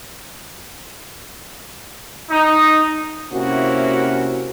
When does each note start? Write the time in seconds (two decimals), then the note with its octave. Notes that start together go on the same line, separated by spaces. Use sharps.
2.30 D#4
3.33 C3 A#3 C#4 E4 F#4